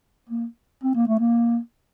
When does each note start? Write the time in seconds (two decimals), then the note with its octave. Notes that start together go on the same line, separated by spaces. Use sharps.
0.30 A#3
0.84 C4
0.95 A#3
1.08 A3
1.20 A#3